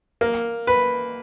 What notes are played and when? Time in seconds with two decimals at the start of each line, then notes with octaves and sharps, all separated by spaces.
0.21 A#3
0.67 B4